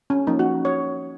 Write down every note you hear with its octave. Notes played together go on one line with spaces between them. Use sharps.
C#4
F3 A#3 C#4 D#4
F#4
C#5